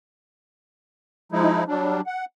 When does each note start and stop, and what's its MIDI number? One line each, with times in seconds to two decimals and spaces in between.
1.32 1.64 53
1.32 1.64 56
1.32 1.64 63
1.32 1.64 64
1.68 2.01 54
1.68 2.01 55
1.68 2.01 62
2.07 2.25 78